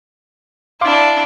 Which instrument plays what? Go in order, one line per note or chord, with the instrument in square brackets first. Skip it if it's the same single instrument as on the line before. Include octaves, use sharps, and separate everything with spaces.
[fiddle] D4 E4 [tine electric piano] F5 C6 D6